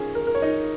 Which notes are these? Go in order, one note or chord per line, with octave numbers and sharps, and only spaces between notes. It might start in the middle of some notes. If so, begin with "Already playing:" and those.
Already playing: D#3 C#4 F4 G#4
A#4
A#4
C#5
D#4 D#5